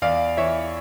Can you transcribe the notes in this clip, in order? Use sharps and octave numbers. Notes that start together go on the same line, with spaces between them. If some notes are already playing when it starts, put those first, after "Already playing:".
E2 D5 F5
E3 C#5 E5